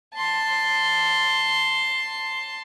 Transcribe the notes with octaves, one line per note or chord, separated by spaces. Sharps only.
A5 C6